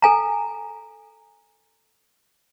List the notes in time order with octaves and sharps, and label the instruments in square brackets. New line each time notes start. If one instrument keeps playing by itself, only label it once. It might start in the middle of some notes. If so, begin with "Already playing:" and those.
[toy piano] A4 G#5 A#5